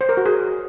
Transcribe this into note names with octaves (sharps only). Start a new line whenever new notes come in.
C5
A#4
F#4
G#4